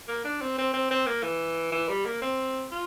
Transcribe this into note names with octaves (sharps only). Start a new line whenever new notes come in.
A#3
D4
C4
C4
C4
C4
A#3
E3
E3
G3
A#3
C4
F4